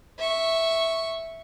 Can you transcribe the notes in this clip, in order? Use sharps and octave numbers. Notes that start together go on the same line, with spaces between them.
E5 C#6